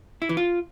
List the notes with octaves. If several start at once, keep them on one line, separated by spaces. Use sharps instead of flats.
E4
E3
F4